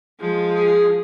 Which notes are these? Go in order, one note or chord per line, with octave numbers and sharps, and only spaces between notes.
F3 G#3
G#4